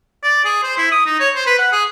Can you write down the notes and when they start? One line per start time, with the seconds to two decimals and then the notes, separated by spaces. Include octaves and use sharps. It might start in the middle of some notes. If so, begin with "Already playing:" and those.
0.23 D5
0.45 G#4
0.63 C5
0.78 E4
0.92 D#6
1.06 D#4
1.20 C#5
1.35 C5
1.46 B4
1.58 F#5
1.72 G#4